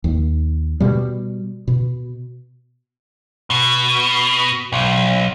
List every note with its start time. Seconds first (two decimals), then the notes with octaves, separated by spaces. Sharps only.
0.04 D#2
0.80 B2 G3
1.68 B2
3.50 B2
4.72 B1